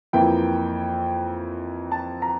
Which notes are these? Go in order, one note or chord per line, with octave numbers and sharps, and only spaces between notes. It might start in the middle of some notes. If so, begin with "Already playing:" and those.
F2 E3 A#3 E4 G5
A5
A#5